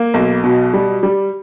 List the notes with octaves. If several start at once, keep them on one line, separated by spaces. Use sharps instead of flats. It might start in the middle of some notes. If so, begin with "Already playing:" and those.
Already playing: A#3
B1
B2
G3
G3